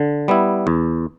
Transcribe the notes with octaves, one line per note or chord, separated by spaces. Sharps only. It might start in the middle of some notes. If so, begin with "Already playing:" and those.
Already playing: D3
G3 B3 E4
E2